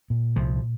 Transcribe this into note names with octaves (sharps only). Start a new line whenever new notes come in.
A#2
C2 F3